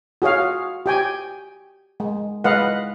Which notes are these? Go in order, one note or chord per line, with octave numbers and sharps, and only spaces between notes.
F#4 G#4 C#5 F5
G4 G5 G#5
G#3
G#3 B4 D#5 F5 F#5